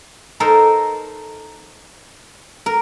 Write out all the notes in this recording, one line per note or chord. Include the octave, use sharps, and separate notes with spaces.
D#4 A4 A#4 C5
A#4